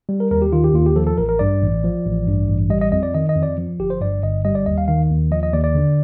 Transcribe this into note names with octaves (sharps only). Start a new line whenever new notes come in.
G3
A#4
D#2 A#4
G4
D#3 F4
G4
D#2 F4
G4
F3 A4
A4
A1 A#4
A#4
G2 D5
A1
F3
A1
G2
A1
G3 D#5
D#5
F2 D#5
D5
D#3 D#5
D#5
F2
D5
F3
G1 G4
C5
G2 D5
G1 D#5
G3 D#5
D5
D#2 D#5
F5
D#3 F5
D#2
F3 D#5
D#5
D#2 D5
D5
D3